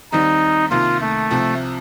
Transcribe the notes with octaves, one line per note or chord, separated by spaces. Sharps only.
D#2 D#3 G3 C4 D#4
C2 C3 D#3 A#3 F4
A3
C2 C3 F3 C4